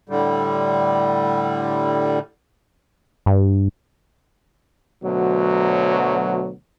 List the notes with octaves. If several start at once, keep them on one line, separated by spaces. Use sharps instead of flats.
A2 D3 G3
G2
D2 B2 F#3